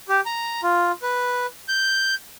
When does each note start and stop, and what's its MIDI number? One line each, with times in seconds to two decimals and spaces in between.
0.09 0.21 67
0.26 0.61 82
0.63 0.92 65
1.02 1.46 71
1.68 2.15 91